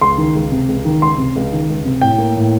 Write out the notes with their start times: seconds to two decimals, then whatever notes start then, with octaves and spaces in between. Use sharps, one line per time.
0.01 C#2 C6
0.18 D#3
0.35 C#2
0.52 C3
0.68 C#2
0.85 D#3
1.01 C#2 C6
1.18 C3
1.36 C#2
1.52 D#3
1.69 C#2
1.85 C3
2.01 A2 G5
2.18 A#3
2.36 A2